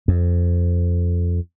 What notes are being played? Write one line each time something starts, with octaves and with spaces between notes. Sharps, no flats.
F2